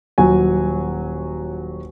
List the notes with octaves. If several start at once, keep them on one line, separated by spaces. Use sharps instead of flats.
D#1 F#3 F#4 G#5